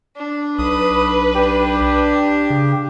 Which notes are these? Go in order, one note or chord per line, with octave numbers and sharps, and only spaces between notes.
D4
B1 B4 D#6
D4 G4
C#3